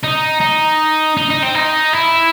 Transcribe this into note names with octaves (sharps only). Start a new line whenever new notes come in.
D#4
D#4
D#4
D#4
C4
D#4
E4